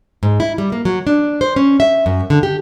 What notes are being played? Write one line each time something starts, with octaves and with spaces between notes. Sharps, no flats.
G#2
E4
G3
A#3
F#3
D4
C5
C#4
E5
F#2
D3
G4